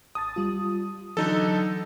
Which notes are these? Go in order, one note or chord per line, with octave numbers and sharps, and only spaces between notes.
G#1 A5 D#6 A6
G3 F4
D3 E3 F#3 D#4 A4